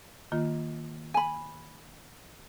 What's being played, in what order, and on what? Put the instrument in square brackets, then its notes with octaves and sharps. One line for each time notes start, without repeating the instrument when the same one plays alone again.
[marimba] D#3 A#3 F4
[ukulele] G#5 B5